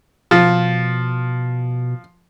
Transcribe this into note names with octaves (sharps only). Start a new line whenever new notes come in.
B2 F3